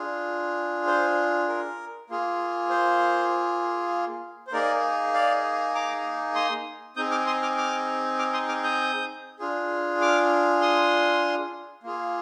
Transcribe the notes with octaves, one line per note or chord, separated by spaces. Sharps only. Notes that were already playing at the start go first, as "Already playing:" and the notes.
Already playing: D4 F4 G#4
C5
A#4
A#3 F4 G#4
C5
C5
A#3 D#4 G#4 A#4 D5
D5 F5
A#5 D6
C6 D#6
C4 D#4 G#4 D#6 G6
D6 F6
C6 D#6
D6 F6
D6 F6
D6 F6
C6 D#6
D6 F6
D#6 G6
D4 F4 G#4
D6 F6
C6 D#6
A#3 F4 G#4